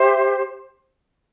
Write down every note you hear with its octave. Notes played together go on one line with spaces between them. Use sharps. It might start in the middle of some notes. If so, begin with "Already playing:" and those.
Already playing: G4 C5 E5